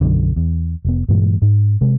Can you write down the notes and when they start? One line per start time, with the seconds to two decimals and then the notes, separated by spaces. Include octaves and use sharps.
0.01 B1 F#2 D3
0.36 E2
0.85 F1 B3
1.09 G2 A#2 E3 G#3
1.42 G#2
1.81 C3 G#3